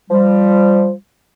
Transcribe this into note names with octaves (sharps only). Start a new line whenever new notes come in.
F3 G3